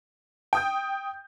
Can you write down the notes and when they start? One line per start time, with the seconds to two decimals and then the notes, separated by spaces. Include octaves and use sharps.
0.53 G5 D#6 G6